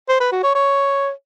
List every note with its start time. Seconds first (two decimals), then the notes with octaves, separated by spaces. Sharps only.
0.09 C5
0.20 B4
0.32 F#4
0.44 C#5
0.55 C#5